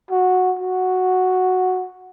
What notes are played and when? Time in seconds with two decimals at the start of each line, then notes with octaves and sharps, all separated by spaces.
0.11 F#4
0.59 F#4